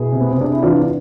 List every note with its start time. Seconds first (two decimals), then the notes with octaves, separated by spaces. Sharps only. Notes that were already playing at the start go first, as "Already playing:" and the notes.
Already playing: B2 E4 G#4
0.12 C3
0.20 B3
0.31 C4
0.37 C3 D4
0.53 E4
0.62 E2 D4 F4
0.80 D4